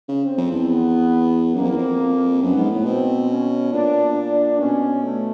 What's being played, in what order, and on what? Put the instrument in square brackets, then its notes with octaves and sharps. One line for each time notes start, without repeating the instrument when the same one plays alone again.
[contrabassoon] C#3
[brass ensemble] C4
[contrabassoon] F2
E2
[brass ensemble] B3
[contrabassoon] F#2 [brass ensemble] A#3
[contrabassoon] F2
E2
F2
[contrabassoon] F#2 [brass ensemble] B3
[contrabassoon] G#2
A2
[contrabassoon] B2 [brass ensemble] C4
[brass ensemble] C#4
[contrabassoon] A#2 [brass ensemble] D4
[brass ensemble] D4
[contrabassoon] B2 [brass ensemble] C#4
[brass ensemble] A3